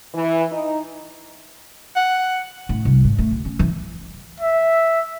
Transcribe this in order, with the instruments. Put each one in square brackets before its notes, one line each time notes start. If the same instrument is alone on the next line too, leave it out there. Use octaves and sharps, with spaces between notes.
[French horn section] E3
D#4
[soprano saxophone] F#5
[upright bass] A2
C2
G#2
A3
D2
C#4
E3
[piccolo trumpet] E5